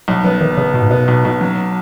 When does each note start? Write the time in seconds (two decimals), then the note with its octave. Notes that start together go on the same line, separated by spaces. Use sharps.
0.08 B1 F#3
0.24 F#3 B3
0.41 D#3 B3
0.57 C#3 B3
0.74 B1 B2
0.82 G#2
0.89 B2 B3
1.08 B1
1.25 B1
1.41 F#3